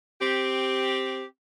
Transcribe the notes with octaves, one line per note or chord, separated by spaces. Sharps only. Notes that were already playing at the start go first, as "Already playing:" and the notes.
C4 G4